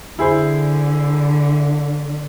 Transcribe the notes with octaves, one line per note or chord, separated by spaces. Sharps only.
D3 E4 G#4 C5